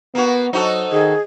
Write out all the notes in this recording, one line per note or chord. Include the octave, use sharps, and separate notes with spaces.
A#3 B3 F#4
F#3 D#4 F#4 A4 C5 D#5
D#3 G#4